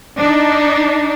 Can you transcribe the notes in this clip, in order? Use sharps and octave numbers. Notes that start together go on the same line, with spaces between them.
D4 D#4